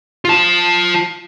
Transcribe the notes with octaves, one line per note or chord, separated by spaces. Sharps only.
F4 A5